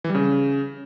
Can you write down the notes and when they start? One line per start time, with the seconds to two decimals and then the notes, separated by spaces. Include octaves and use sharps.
0.04 E3
0.10 G3
0.15 C#3